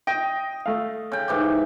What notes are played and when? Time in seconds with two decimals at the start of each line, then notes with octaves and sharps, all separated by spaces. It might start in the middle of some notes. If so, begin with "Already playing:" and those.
0.07 D#5 G5
0.66 A3 F5
1.12 C#3 G5
1.28 G#2 E3 G4